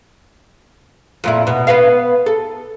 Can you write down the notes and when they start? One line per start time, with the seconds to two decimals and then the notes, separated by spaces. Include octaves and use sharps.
1.24 F2 A#2 E4
1.47 B2
1.67 B3 B4 F5
2.26 A4